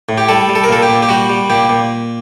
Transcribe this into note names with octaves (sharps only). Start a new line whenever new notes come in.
A2
G4
G3 A4
G3
A4
A#4
A#2 A4
G4
A#2
G4
G3 F#4
G3
A#2 G4
A#2